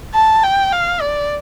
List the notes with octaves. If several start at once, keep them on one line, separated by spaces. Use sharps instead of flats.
A5
G5
F5
D5